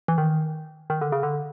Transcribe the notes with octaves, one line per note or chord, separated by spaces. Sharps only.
E3
D#3
D#3
D3
C#3
D3